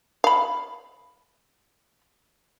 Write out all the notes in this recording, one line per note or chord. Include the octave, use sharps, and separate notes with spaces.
F5 B5